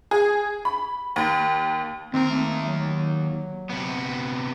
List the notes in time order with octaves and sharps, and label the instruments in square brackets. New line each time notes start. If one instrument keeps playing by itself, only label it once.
[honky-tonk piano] G#4
B5
D#2
[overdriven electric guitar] D#2 A#4 [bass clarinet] C4
[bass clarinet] A3
F#3
[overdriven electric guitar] C3 B3